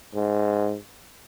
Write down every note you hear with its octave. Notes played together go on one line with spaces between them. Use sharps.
G#2